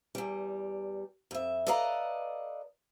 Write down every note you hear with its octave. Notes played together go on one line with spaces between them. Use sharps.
E2 G3
F2 E5
A4 B4 D5 D#5 F5 A#5